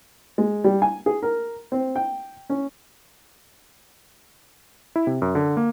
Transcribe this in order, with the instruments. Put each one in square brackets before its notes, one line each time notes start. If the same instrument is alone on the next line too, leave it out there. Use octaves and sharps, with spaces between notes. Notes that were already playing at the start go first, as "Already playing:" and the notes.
[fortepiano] G#3
G3
G#5
G#4
A#4
C4
G5
C#4
[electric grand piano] E4
C3
F#2
D3
A#3